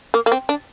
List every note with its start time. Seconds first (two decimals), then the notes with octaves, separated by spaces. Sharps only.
0.14 A#3
0.26 A#3
0.32 C4
0.49 D4